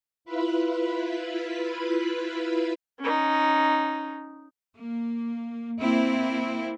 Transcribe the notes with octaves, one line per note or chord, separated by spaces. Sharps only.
E4 F4 B4 B5
C#4 D#4
A#3
A#3 C4 E4